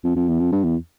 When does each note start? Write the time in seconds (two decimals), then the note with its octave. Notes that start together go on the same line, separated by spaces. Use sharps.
0.04 F2
0.16 F2
0.28 E2
0.40 F2
0.52 G2
0.63 E2